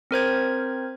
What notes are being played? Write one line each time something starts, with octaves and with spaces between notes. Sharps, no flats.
C4 A#4 C5 G#6